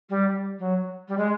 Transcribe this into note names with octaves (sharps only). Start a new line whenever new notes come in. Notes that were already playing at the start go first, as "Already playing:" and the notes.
G3
F#3
G3
G#3